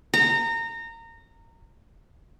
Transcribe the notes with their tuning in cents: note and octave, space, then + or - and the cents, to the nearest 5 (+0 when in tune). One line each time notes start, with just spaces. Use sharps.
A#5 -25